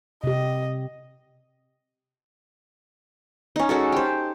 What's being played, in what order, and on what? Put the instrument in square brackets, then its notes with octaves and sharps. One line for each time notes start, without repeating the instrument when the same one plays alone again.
[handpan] C3 G4 [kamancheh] D#5
[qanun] C#4 D#4
G#3 C#4 F#4 A4
G4 C5